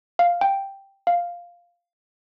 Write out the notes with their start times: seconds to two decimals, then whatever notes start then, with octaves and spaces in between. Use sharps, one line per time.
0.19 F5
0.41 G5
1.07 F5